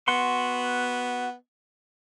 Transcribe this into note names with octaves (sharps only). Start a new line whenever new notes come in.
B3 F#4 F#5 C6